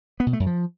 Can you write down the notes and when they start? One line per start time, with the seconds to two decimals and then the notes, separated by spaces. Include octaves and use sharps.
0.20 B3
0.27 B2
0.33 A3
0.40 F#2
0.46 F3